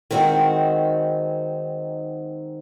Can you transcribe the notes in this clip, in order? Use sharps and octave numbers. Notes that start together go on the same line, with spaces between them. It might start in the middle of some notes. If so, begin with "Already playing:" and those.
D#3 G#3 C4 D#4 F#4